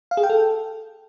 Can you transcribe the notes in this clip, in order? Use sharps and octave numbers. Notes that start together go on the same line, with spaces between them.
F5
G#4
G5
A4